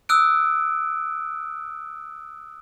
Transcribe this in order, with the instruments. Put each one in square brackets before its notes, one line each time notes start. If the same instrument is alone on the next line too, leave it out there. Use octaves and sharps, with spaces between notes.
[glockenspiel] D#6 E6 F#6 D7